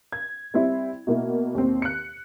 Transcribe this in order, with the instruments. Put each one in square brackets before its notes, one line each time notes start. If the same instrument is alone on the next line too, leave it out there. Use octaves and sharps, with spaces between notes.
[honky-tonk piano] G#6
G3 C4 E4
B2 A#3 E4
D#2 C4
F#6 C#7